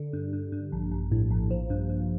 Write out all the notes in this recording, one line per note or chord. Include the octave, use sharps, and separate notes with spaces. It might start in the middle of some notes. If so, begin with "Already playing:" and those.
Already playing: D3
G2
G2
G2
A#1
A#1
A2
A#1
F3
G2
G2